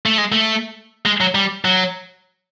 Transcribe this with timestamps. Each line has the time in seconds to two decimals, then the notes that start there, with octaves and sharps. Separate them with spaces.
0.06 A3
0.18 G#3
0.32 A3
1.05 G#3
1.21 F#3
1.35 G3
1.65 F#3